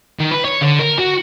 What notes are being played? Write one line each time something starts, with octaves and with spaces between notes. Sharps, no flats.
D#3
B4
C#5
D3
A#4
F#4